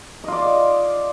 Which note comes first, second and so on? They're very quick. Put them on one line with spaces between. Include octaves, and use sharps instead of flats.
D#5 F4 D5